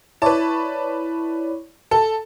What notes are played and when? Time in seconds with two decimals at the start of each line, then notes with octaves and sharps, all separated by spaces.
0.22 E4 B4 C#5 D5 A5
1.91 A4 A5